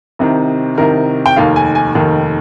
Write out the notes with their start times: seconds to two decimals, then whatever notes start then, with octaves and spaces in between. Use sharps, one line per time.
0.19 C2 C3 D#3
0.78 C2 C3 D#3 A#4
1.26 G5
1.36 F1 D#2 D#3 F5
1.56 G#5
1.75 G#5
1.95 F1 D#2 D#3